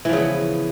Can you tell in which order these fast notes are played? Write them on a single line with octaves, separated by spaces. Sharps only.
E3 F3 C#3 B3